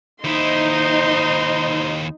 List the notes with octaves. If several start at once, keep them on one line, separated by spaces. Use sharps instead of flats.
D#2 D#4 E4 C5 C6